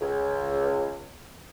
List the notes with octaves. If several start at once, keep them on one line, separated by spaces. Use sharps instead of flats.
C#2